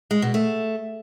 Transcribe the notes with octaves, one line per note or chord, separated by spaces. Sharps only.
G#3
B2
A3